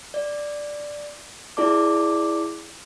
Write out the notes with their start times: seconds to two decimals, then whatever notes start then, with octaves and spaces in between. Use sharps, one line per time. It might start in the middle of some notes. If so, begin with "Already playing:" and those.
0.14 D5
1.57 E4 G#4 D5 A5 D6